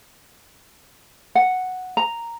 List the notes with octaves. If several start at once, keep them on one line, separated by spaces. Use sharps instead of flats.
F#5
A#5